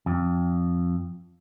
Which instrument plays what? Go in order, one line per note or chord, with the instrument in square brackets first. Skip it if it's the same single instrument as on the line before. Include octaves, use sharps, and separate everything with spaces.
[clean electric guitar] F2